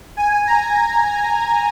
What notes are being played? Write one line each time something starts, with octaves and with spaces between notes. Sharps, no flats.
G#5
A#5